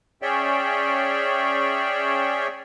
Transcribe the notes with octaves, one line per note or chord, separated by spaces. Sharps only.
C#4 G#4 C#5 D5 E5 G5